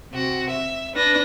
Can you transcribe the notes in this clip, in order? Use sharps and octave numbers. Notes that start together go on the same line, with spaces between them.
C3 F#4
E5
D4 B4 A#6